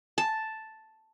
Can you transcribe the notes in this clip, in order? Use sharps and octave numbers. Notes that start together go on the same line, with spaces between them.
A5